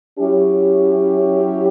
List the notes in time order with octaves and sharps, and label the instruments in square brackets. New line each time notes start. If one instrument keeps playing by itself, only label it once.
[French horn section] F#3 C#4 E4 G4